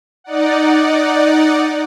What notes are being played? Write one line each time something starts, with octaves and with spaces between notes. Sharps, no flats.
D#4 D5 F#5